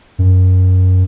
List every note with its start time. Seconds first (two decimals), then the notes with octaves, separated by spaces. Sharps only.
0.19 F#2